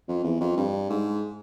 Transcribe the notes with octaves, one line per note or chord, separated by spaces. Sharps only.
F2
E2
F2
G2
G#2